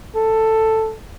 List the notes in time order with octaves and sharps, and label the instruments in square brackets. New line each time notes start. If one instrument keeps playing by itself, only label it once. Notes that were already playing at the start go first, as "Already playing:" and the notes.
[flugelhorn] A4